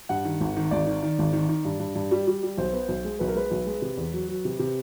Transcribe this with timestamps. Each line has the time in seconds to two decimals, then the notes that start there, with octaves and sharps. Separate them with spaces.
0.09 G2 F#5
0.25 D#3
0.41 G#1
0.57 D#3
0.71 G#1 D5
0.87 D#3
1.03 D#3
1.19 G#1
1.33 D#3
1.49 D#3
1.65 G2
1.80 G2
1.95 G2
2.11 G3
2.27 G3
2.43 G3
2.58 B1 C5
2.73 B3
2.88 B1
3.04 G#3
3.19 B1 B4
3.28 A#4
3.35 G#3 B4
3.51 B1
3.66 G#3
3.82 C3
3.97 E2
4.13 F#3
4.28 F#3
4.45 C3
4.59 C3